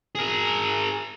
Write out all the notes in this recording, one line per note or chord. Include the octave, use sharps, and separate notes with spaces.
G#4 A#4